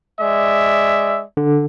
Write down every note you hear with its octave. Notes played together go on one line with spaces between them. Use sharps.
G#3 D5 E5
D3